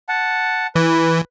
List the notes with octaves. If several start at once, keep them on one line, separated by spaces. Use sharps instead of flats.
F#5 A5
E3 B4